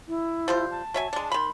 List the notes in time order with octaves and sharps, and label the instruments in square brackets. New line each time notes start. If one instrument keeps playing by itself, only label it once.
[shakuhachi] E4
[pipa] F3 G3 C5
[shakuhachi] A5
[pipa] F#3 E5 G#5
G#3 D4
[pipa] D#3 B5 [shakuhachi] C6